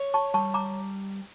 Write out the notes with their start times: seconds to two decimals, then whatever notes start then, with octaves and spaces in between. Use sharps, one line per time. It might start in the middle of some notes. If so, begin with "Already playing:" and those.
Already playing: C#5
0.14 A5 C#6
0.34 G3 A5 C#6
0.54 A#5 D6